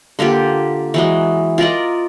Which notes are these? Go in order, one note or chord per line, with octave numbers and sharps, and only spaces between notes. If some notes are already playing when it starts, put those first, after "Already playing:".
D3 A#3 F4 G4
E3 F#3 G#3
F4 A#4 D5 D#5